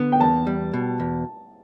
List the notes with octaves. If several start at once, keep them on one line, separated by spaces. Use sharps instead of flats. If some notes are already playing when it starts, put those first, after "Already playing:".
Already playing: D3 B3
G5
E2 A5
G3
B2
E2